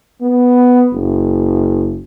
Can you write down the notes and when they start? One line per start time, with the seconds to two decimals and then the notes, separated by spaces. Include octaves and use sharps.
0.22 B3
0.92 F#1